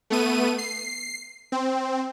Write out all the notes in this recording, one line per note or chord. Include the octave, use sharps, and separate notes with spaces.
A3 B3 D#7
C7
C4